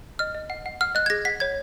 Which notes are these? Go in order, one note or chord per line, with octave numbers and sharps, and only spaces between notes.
D#5 F6
D#5
F#5
F#5
F#5 F6
D#5 F#6
G#6
G#4 A#6
F#5 B6
C#5 G#6